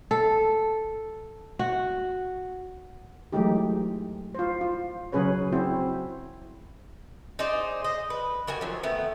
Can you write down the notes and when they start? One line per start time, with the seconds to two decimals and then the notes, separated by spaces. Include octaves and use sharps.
0.11 A4
1.59 F#4
3.32 E3 F#3 G#3 A3 D#4 G4
4.35 F4 C5
4.61 F4
5.12 C#3 F#3 C#4 G#4 B4 C#5
5.52 C4 E4 F#4 C5
7.39 D#4 G#4 C5 D5
7.84 D#5
8.10 B4
8.47 D#3 G3 F#4 G#5
8.61 F3 F#3
8.83 D#3 A3 B3